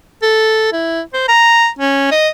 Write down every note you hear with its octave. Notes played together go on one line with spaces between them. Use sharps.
A4
E4
C5
A#5
C#4
D#5